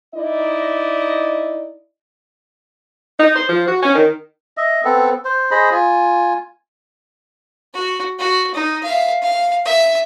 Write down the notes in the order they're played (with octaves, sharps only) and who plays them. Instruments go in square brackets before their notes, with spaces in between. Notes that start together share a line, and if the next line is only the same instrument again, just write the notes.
[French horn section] D#4 E4 D5 D#5
[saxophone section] D#4
C5
F3
F#4
C#4
D#3
[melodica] D#5 E5
B3 C4 A4
C5
G#4 C5 D#5 B5
F4 G#5
[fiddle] F#4
F#4
D#4
E5 F5
F5
E5